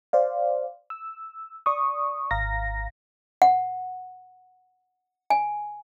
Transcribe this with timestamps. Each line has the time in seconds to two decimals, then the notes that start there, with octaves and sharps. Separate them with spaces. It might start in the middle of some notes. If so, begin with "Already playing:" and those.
0.13 C5 D5 F5
0.90 E6
1.66 D5 C#6 D#6
2.31 G#1 F5 A#5 A#6
3.42 F#5
5.30 G#5